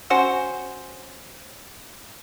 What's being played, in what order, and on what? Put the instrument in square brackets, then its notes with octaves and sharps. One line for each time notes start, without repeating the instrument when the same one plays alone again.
[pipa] C#4 F#4 C5